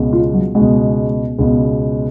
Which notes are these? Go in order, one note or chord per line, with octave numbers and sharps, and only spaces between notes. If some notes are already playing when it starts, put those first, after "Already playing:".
Already playing: C#2 B2
F4
F#3
C#2 B2 G#3
C#2 B2